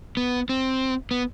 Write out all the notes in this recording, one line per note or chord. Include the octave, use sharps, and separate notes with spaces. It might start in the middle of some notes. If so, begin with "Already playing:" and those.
B3
C4
B3